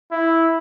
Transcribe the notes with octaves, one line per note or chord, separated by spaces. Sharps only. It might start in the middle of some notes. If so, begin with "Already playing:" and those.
E4